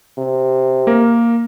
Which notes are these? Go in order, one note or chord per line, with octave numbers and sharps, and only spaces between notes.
C3
A#3 A#4